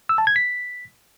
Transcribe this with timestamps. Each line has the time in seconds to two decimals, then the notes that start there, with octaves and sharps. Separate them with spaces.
0.09 E6
0.18 A5
0.27 G#6
0.36 B6